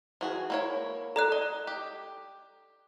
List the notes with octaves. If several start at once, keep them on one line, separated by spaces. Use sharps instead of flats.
E3 F#4 G#4
A#3 E4 C#5
A4 D5 A#5 F#6
D#5
G4